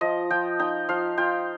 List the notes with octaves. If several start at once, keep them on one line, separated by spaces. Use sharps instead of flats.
F3 D#5
F3 G5
D#4 G5
F3 F5
F4 G5